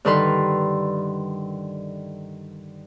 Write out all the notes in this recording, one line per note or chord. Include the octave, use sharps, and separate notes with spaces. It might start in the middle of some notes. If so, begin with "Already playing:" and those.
G2 D3 D#3 A4 B4 C6